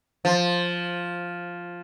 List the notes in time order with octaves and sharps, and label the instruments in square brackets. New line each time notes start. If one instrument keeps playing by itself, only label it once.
[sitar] F3